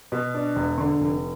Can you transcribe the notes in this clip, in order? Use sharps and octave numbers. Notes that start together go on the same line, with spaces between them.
B2
D4
E1
D3
F1